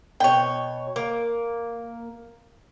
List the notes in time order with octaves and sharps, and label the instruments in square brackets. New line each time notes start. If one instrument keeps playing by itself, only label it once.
[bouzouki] B2 C#5 [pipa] G5
[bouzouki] A#3